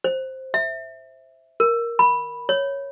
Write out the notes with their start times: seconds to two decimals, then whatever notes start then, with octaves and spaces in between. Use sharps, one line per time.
0.04 C5
0.54 E5
1.60 A#4
1.99 B5
2.49 C#5